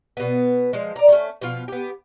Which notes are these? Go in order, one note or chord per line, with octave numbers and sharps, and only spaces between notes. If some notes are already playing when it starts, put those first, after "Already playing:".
B2 B3
F3 G#3
D5 A#5
A3 C#4
B2 F3 F4 F5
B3 G4